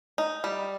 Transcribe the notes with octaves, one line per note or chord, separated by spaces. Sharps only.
D#4
G3